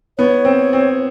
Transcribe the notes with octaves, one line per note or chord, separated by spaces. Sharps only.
B3 C#5
C4
C4